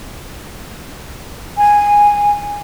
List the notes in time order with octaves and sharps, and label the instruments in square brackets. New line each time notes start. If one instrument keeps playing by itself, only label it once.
[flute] G#5